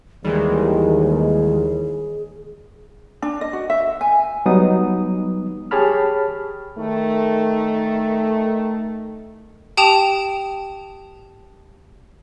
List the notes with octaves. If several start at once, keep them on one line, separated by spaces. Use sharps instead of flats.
D#2 D#3 E3 G3 G#3 G#4
D4
D#5
F#4
E5
G#5
F#3 G3 B3 D#4 D#6
G4 G#4 C#5 A5 B5 F6
D#3 A3
G4 G5 A5 D#6 E7 F7